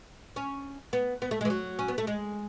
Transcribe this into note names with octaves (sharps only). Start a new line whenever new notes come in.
C#4
B3
B3
A3
G#3
E3
F#3
C#4
B3
A3
G#3